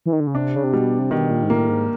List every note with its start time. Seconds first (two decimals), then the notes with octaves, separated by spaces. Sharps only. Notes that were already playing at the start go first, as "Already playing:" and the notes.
0.06 E3
0.13 D#3
0.20 D3
0.27 C#3
0.35 C3 D4
0.56 C#3
0.64 C3
0.73 B2 G3
0.99 C3
1.11 B2 D#3
1.30 A#2
1.43 G#2
1.49 A2 A#3
1.69 G#2